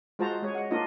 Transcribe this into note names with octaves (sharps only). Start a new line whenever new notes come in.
G#3 F4 F#4 C5 A5 A#5
G#3 G#4 C#5
D#5 F#5
A#3 D4 D#4 F4 D#5